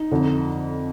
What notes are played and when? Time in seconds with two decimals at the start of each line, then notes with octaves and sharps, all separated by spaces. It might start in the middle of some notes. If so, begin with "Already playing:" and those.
Already playing: D#4
0.11 F2 D3